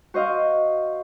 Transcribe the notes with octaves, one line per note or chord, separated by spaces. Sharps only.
F#4 C5 D#5 F5